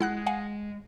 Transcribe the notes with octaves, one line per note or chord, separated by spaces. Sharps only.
G#3 E4 F#5 F#6
F5 F#5 G#5